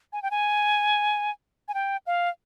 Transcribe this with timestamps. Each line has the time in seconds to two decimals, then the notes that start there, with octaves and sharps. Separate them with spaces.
0.13 G#5
0.23 G5
0.31 G#5
1.68 G#5
1.74 G5
2.07 F5